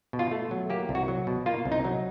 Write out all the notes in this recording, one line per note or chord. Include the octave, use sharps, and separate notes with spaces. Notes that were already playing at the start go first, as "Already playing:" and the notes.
B2
F4
A3
F#3
A#3 G4
C2
F#4
F#3
B2
A#3 F4
C2
D#4
F#3